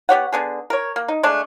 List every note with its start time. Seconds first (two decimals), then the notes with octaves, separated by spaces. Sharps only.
0.09 B3 G4 C#5 F#5
0.32 D3 B3 G#4
0.70 A#4 C#5
0.96 A#3
1.08 D#4
1.23 G#3 A3 D4